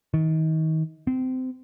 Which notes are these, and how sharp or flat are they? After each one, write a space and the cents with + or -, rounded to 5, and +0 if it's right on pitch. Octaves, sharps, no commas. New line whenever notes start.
D#3 +30
C4 -25